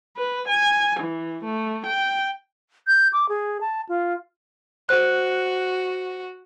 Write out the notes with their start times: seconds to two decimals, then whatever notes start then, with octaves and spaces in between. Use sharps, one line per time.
0.17 B4
0.49 G#5
1.00 E3
1.43 A3
1.86 G5
2.87 G6
3.13 D6
3.29 G#4
3.61 A5
3.89 F4
4.89 F#4 C5 F#6